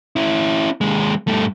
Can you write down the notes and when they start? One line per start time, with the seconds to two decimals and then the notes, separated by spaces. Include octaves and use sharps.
0.16 C#4 E4
0.81 D#2 G#3
1.28 G2 A3